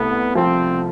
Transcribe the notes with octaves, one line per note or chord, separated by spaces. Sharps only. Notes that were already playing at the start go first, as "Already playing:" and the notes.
Already playing: C2 A3 B3
F3 C4